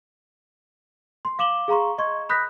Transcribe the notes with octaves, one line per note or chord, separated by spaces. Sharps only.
C6
F5 D6 E7 F#7 G7
G#4 F5 A#5 C6 C#6
D#5 C6 C#6 G#6
B5 D#6 F#6 G6 A#6 B6